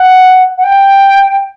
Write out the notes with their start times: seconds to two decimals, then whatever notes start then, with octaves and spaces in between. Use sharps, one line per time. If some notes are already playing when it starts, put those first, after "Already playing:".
Already playing: F#5
0.58 F#5
0.64 G5